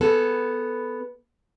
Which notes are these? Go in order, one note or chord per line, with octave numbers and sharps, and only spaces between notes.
B3 G#4 A4